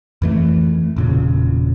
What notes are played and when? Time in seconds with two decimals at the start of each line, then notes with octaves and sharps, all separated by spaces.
0.22 F2 E3 A3
0.96 E1 A#2 C#3